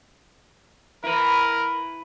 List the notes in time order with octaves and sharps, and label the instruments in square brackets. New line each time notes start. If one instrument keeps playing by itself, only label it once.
[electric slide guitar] E4 B4 [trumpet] A#4